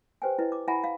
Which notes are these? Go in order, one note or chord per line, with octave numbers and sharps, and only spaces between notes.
G4 B4 C5 G5 G#5
E4 B4 D#5
D6
E4 E5 F#5 G#5 A#5 B5
F5